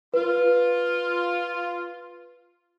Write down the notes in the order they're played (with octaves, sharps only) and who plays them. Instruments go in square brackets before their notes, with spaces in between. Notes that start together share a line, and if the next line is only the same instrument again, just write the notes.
[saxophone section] F4 [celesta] B4